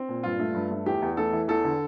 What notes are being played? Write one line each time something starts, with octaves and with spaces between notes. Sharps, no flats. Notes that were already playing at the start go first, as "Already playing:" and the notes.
Already playing: C4
A#2
G2 F4
A3
G2
A3
E2 G4
E2
A3 A4
E3
E2 A4
D3